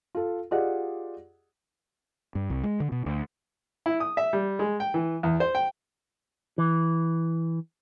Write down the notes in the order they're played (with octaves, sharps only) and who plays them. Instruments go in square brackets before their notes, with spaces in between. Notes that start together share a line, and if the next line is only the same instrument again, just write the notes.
[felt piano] F4 A4
F4 G4 G#4 D5 D#5 F#5
[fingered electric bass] G2
C2
G#3
D3
B2
D2
[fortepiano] E4
D#6
E5
G3
G#3
G5
E3
E2
C5
G5
[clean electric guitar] E3